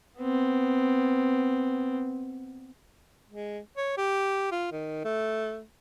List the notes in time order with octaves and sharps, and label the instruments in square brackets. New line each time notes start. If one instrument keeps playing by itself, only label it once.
[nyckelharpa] B3 C4
[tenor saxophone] G#3
C#5
G4
F4
D#3
A3